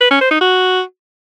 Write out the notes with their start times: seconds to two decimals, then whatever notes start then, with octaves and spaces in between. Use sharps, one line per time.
0.01 B4
0.11 C#4
0.21 C5
0.31 D#4
0.41 F#4